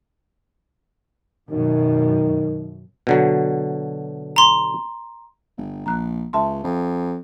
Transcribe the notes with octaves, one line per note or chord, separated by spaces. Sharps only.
F#2 B2 D#3
B2 D3 F#3
A#5 C6
G1
A#1 A#5 F#6
C#2 E5 A5 C6
F2